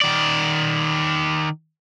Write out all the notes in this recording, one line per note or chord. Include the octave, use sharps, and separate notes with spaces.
D#3 D5